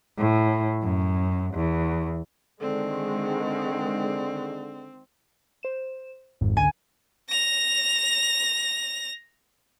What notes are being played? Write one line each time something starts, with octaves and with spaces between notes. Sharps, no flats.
A2
F#2
E2
D3 D#3 G#3 C4
C5 E7
G#1 F2 G#2
C#2 D3 G#5
A#6 F7